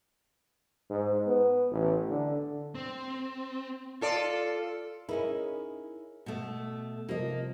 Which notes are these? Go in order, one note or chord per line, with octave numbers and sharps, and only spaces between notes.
G#2
B3
A1
D3
C4
F4 A4 D5
C#4 D#4 E4 G#4 A#4
B2 A3
C3 F3 G3 A#3 D#5